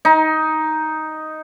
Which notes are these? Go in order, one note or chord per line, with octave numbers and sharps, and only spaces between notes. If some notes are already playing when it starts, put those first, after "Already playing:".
D#4